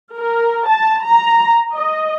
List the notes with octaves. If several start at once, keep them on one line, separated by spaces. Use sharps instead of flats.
A#4
A5
A#5
D#5